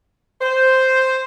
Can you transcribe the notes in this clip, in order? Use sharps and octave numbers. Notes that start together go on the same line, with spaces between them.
C5